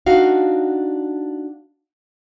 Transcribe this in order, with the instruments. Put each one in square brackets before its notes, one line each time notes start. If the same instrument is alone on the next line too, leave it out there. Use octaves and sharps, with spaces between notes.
[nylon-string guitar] D4 D#4 F#4 F5